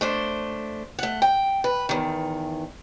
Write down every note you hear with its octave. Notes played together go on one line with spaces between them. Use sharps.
A3 D4 C5
A3 F#5
G5
B4
E2 D#3